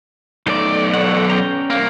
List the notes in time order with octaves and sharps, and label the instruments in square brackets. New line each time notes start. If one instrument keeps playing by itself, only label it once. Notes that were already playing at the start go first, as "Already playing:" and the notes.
[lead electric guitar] B1 D5 [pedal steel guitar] A3 D#4
[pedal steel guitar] A4 C#5 F#5
C#4 G5 A#5
[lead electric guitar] C2 A#3